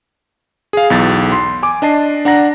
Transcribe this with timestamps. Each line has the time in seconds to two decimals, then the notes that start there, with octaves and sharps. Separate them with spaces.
0.73 G#4 F5
0.90 B1 E2 A6
1.32 C6
1.63 G#5 D6
1.82 D4 D#5 A5 C7
2.25 D4 F#5 A#5 A#6